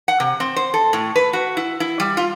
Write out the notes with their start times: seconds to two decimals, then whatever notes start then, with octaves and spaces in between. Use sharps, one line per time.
0.08 F#5
0.20 C3
0.40 C4
0.56 C5
0.74 A4
0.93 A2
1.16 B4
1.33 F#4
1.57 E4
1.80 E4
2.00 G3
2.17 F4